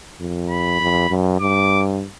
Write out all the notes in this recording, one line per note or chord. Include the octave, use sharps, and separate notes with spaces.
F2
B5
F2
F#2
G2 D6